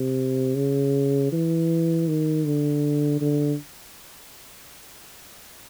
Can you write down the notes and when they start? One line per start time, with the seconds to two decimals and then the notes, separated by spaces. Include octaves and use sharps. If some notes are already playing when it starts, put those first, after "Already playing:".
Already playing: C3
0.55 C#3
1.32 E3
2.08 D#3
2.45 D3
3.21 D3